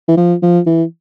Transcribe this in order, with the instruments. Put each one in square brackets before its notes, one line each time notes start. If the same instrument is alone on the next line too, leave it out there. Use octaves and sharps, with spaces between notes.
[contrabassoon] E3
F3
F3
E3